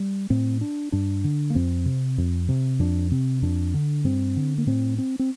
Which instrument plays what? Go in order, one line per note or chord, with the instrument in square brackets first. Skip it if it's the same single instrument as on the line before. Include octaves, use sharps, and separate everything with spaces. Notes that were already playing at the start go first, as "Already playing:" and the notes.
Already playing: [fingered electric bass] G3
A2 C4
D4
G2 D4
D3
A#3
F2 C4
C3
F2
C3
F2 D4
C3 C4
F2 D4
D3
G2 C4
D3
A#3
A2 C4
C4
C4